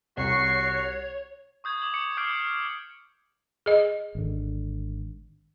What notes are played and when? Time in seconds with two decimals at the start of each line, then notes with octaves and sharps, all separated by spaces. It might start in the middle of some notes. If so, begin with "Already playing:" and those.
0.18 C2 F#4 C#5 C#6 C7
1.64 C#6 D#6 G6 G#6
1.82 D6 F#7
1.94 D6 C#7
2.17 D6 F6 G6 C7 D7
3.66 G#4 D#5
4.15 G#1 D3